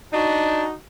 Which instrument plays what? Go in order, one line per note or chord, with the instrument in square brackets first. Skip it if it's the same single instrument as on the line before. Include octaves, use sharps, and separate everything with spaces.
[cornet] D4 [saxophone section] D#4 F#4